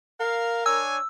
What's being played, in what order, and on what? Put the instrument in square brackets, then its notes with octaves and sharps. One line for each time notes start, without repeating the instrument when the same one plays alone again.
[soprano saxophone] A#4 [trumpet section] F5
[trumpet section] D4 C#5 G#5 [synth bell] E6